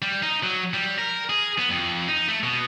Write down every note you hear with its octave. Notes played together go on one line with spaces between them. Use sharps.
G3
D#4
F#3
G3
A#4
G#4
B3
F2
D#4
A3
B2